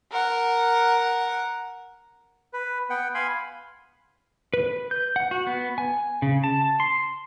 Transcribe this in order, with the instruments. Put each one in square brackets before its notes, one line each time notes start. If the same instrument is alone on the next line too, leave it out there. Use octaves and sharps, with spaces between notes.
[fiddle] A#4 F#5
[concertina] B4
B3 F#5 G5
F5 G#5 B5 C6
[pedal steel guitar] B4
G6
F#5
F#4
B3
G#5
C#3
A5
C6